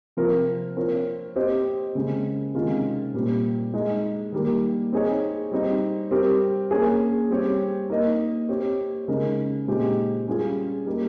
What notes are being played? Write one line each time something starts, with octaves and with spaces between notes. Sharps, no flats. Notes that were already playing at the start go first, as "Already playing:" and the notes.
C3 F3 C4 F4 A#4
C4 F4 A#4 C#5
C4 G4 C5 D#5
C#3 G#3 C4
C3 D#3 G#3 C#4 F4
A#2 G3 C4
G#3 D#4 G#4
D#3 G3 A#3
C4 D#4 G#4 C#5
G3 C4 D#4
G3 C4 G4 A#4
A#3 C#4 G#4 C#5
G3 C4 G4 C#5
A#3 D#4 A#4 D#5
C4 G4 C#5
C#3 G#3 D#4 A#4
A#2 G#3 C4 D#4 G4
G3 C#4 F4 G#4
G3 A#3 D#4